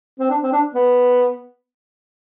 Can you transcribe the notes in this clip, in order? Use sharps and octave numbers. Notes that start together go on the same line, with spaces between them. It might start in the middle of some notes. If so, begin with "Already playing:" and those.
C4
D4
C4
D4
B3